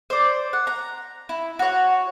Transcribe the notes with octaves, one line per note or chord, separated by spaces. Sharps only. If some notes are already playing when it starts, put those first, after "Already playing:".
C5 D5
F#5
A#5
E4
F#4 C#5